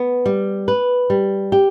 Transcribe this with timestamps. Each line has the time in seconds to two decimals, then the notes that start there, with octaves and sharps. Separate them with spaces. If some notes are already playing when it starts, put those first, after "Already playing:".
Already playing: B3
0.26 G3
0.68 B4
1.10 G3
1.52 G4